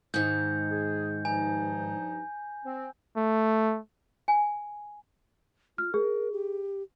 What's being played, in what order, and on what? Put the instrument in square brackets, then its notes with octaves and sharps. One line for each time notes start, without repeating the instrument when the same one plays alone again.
[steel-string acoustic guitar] G#2 D#3 [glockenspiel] G6
[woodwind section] G#4
[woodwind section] G2 F3 D#4 [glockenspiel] G#5
[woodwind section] C4
[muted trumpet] A3
[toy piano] G#5
[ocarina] F4 [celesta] F6
[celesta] G#4 [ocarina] A#4
[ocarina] G4